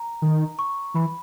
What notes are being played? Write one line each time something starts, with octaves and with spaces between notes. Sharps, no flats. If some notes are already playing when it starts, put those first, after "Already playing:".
Already playing: A#5
D#3
C#6
E3 B5